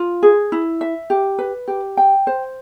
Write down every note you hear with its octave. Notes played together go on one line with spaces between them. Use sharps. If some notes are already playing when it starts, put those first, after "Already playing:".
Already playing: F4
G#4
E4
E5
G4
B4
G4
G5
C5